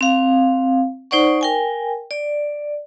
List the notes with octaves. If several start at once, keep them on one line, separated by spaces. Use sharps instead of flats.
C4 F5
D#4 C5 D5 F#5 C#6
A#4 G5 G#5
D5